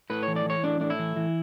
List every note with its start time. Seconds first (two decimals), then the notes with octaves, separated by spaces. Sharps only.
0.10 A2 B4
0.23 E3 C#5
0.36 D5
0.46 E3 C#5
0.64 A2 D4
0.81 A2 D4
0.90 E4
0.99 E3
1.16 E3